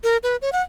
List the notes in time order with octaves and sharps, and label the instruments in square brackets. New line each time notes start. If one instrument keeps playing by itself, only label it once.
[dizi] A#4
B4
C#5
F#5